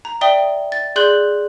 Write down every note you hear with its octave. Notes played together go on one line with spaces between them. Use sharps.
A#5
D5 E5 G5 D#6 G7
A6
G#4 D5 C6 F#6 G6 F#7